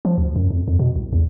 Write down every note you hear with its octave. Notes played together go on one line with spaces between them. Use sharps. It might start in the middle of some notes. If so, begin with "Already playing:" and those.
F3
D2
F#2
F2
F2
B2
C2
E2